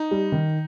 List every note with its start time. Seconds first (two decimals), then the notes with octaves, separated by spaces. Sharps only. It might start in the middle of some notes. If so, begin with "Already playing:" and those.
Already playing: D#4
0.11 G3
0.32 D#3